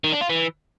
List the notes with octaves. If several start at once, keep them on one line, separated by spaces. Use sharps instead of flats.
D#3
D4
F4
E3